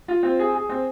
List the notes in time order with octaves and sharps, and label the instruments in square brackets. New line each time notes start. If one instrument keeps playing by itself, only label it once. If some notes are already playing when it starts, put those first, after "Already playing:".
[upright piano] F4
C4
G#4
G#4
C4